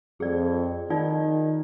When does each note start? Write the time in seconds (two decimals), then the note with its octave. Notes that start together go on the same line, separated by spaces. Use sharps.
0.20 F2 G#4 D5
0.90 D#3 D#4 F4 D5